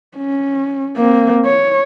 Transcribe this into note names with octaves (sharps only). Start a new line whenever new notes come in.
C#4
A#3 C4
C#5